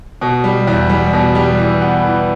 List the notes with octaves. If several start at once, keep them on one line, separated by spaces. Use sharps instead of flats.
B2
G3
E2
G3
B2
G3
E3
B3
E3